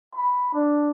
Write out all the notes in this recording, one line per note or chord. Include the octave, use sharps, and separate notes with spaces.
B5
D4